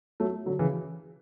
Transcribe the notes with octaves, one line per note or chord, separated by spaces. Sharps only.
F#3 A3
D3 F#3
C#3 E3